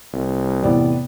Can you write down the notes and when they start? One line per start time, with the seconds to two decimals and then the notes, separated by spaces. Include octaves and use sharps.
0.13 C2
0.63 E2 A2 C3 B3 D5